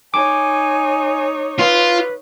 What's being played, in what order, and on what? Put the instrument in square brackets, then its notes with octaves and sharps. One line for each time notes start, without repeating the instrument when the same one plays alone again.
[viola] D#4 C#5 [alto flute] G#5 [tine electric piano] D6
[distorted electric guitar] F4 [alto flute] B4